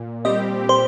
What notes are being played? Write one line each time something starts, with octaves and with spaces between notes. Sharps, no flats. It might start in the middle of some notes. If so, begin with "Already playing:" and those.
Already playing: A#2
G3 C4 G4 D#5
A#2 C5